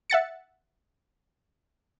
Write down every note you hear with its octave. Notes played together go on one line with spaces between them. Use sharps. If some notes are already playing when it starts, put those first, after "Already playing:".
E5 F#5 A6 C#7